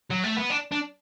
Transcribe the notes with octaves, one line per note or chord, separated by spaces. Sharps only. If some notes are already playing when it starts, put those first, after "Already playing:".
F#3
A3
B3
D4
D4